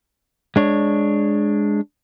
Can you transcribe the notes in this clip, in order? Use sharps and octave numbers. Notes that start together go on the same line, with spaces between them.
G#3 D4 C#5